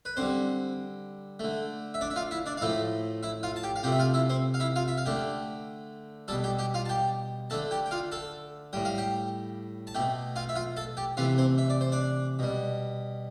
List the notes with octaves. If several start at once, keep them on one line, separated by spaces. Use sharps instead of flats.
B4
D3 G3 C4 C5
D3 A3
E5
D4 D5
E5
F4 F5
E4 E5
D4 D5
F5
A2 F3 A3 E4 E5
E4 E5
F4 F5
A5
G4 G5
F5
C3 F3 A3 G4 G5
E5
F4 F5
E4 E5
C4 C5
F5
E4 E5
F4 F5
E5
F5
D3 A3 G4 G5
B2 G3 A4 A5
G4 G5
G4 G5
F4 F5
A5
G4 G5
D3 A3 A4 A5
G4 G5
G5
F4 F5
A4 A5
A2 G3 G5
F5
G4 G5
A5
B2 A3 G4 G5
F4 F5
E5
F4 F5
A4 A5
G4 G5
C3 E3 A3 F4 F5
C4 C5
E5
D5
C5
D4 D5
B2 G3